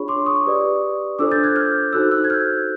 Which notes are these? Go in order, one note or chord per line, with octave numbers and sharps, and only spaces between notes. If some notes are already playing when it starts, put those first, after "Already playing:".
Already playing: D4 F4 G#4 C#5 B5 C#6
C6 D6
C#6 D#6
G4 B4 D5
D4 F4 A4 C5 D6 E6
G6 A6
F#6 G#6
F6 G6
D#4 F#4 A4 C5 E6 F#6
E6 F#6
G#6
F6 G6